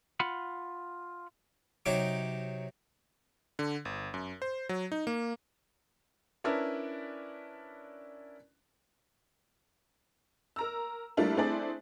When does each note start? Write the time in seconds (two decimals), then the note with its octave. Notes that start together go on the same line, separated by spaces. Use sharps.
0.20 F4 F#5 B5
1.86 C3 F#3 D#4 C#5 D6
3.59 D3
3.85 G1
4.14 F#2
4.42 C5
4.69 F#3
4.92 D#4
5.07 A#3
6.44 C#4 D4 E4 A#4 B4
10.56 A#4 A#5 E6
11.17 G3 A3 A#3 D4 E4 F4
11.37 A3 C4 D4 E4 G#4 D5